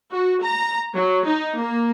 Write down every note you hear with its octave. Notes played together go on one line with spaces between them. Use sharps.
F#4
A#5
F#3
D#4
A#3